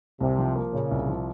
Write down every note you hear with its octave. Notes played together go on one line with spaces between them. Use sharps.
C2 C3
F3
A#3
A#2 C#3
C2
F3